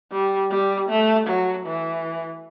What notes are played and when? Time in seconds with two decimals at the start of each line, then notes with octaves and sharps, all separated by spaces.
0.12 G3
0.51 G3
0.89 A3
1.28 F#3
1.66 E3